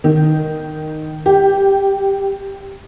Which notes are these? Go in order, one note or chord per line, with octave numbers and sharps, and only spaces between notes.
D#3
G4